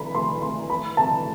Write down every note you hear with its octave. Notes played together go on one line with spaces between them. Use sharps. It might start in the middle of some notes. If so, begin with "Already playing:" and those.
Already playing: B5
C6
C6
B5
A5